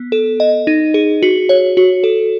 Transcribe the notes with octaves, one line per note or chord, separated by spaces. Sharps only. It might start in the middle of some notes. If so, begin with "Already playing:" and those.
Already playing: B3
A4
D#5
D#4
G#4
F#4
C#5
F#4
A4